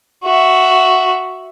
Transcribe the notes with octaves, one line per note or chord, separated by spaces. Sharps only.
F#4 E5